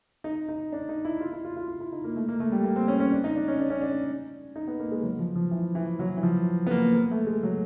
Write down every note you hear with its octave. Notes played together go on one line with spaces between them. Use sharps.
D#4
D#4
D4
D#4
E4
F4
E4
F4
F4
F4
E4
D#4
A#3
A3
A#3
A3
G3
A#3
C4
C#4
C#4
D4
D#4
D4
C#4
D4
C#4
D4
D#4
B3
A#3
G#3
F#3
F3
F3
E3
E3
F#3
E3
F3
B3
A#3
A#3
A3
G#3
F#3